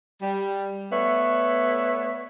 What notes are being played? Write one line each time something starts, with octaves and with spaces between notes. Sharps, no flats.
G3
A3 B3 C#5 D5 E5